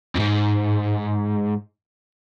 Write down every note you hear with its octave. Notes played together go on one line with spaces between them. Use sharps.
F2 G#2